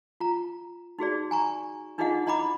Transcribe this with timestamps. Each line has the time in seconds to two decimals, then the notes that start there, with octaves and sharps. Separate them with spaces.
0.20 F4 A#5
0.99 D#4 F#4 G#4 D5
1.31 G#5 A#5 C#6
1.98 D4 D#4 F4 G#4 D#5 F#5
2.27 E4 D#5 A#5 B5 D6